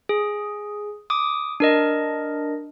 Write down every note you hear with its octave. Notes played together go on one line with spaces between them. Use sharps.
G#4
D6 D#6
D4 A#4 D#5